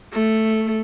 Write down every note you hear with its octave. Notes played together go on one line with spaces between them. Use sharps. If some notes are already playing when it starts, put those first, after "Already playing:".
A3